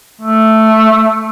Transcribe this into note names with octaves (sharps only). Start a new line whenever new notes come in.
A3